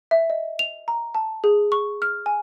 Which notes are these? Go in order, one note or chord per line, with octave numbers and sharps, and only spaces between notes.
E5
D#5
F7
A#5
A5
G#4
C#6
F6
G#5